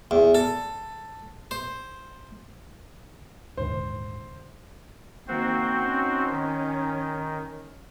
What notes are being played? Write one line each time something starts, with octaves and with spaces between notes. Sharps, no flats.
E2
A4
C5
D#1 G#2 D3 C5
D#3 A#3 C4 F#4 C5
C#4 D#4
D#3